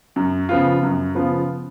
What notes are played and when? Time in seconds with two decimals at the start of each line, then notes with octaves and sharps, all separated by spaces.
0.16 F#2
0.49 C#3 F3 B3 F4
0.83 F#2
1.15 C#3 F3 B3 F4